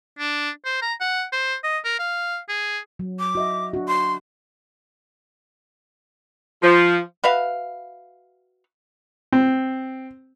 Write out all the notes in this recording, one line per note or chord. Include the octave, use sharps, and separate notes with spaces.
D4
C5
A#5
F#5
C5
D#5
A#4
F5
G#4
F#3
D6
F#4 D#5 E5
D4 F#4
C6
F3
F#4 B4 E5 F5
C4